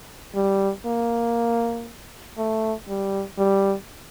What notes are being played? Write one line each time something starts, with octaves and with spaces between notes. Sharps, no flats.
G3
A#3
A3
G3
G3